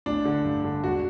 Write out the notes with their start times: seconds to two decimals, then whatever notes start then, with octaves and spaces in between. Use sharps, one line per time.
0.06 A1 D4
0.25 D3
0.45 G2
0.64 D3
0.84 E1 F#4